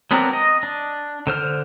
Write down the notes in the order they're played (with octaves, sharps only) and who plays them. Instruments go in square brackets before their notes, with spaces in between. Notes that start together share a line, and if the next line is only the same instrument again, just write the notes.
[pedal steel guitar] F#3 B3 C4 D4 A#4
D#5
D4
D3 C5 F6